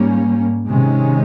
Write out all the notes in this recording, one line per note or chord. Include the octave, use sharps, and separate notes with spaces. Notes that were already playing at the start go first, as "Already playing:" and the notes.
Already playing: G#2 G3 A#3 C#4
C3 D#3 G#3 C#4